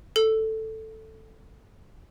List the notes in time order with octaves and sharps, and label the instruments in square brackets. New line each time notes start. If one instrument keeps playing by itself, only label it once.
[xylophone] A4